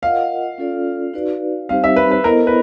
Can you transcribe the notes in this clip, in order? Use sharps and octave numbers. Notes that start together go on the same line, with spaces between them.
F4 A#4 D#5 F5 F#5
C#4 F4 A4 D5
D#4 F#4 B4 D5
G3 C4 D#4 G4 C5 F5
E5
B4
B4
B3 E4 A4 A#4 C5 D#5
B4